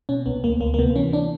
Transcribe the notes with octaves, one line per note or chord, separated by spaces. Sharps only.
B2 C#4
C2 B3
D2 A#3
D2 A#3
A#3
C3 B3
E3 C#4
D4